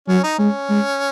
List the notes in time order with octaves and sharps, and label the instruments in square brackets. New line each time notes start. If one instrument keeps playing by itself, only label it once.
[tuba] F#3 [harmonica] C#4
[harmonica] D#4
[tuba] G#3 [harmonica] C#4
[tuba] G#3